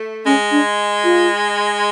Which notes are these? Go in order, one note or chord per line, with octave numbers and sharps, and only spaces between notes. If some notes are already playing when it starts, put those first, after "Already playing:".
Already playing: A3
G#3 C#4
D4
F4